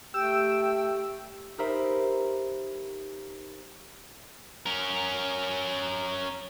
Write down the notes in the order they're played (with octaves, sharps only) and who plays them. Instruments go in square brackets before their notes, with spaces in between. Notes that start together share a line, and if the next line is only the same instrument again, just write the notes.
[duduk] A3 [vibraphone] G4 [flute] G5 [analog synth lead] E6
[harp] D#4 G4 A#4 C5 E5 B5
[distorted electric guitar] C#4 A#4